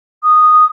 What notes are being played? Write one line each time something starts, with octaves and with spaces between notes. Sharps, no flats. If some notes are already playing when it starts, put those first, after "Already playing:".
D#6